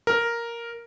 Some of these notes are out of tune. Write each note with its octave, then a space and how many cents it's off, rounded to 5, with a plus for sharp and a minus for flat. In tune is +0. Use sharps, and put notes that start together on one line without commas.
A#4 +0